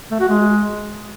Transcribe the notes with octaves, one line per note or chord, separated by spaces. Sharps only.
A3
F#4
G#3